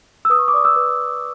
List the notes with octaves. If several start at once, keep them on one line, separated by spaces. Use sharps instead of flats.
E6
B4 D#6
C#6
D6
D5 D#6
E6
B4